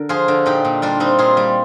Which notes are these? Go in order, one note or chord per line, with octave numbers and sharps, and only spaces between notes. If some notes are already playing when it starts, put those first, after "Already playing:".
Already playing: D3 A#4
F3 F4 G#4
D3
A#2 D#4 G4
A#2
G3 D4 F4
G3 C4 D#4
A#2 F4 G#4
G3